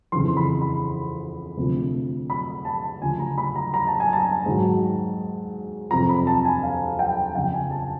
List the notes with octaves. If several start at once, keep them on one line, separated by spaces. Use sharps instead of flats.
F2 C#3 E3 C6
B5
B5
D2 C3 F3
B5
A5
D2 C#3 F3 G#5
A#5
B5
A#5
A#5
A5
G#5
A5
G#2 D#3 F#3
F2 C3 F3 A#5
B5
A5
G#5
F5
G5
F2 C#3 F3 G5
G#5
A5